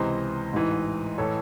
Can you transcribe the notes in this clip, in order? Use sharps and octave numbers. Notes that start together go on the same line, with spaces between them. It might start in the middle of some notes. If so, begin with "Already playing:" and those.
Already playing: C#2 C3 E3 C5 D#5
A1 G#2 E3
A2 E3 A4 C#5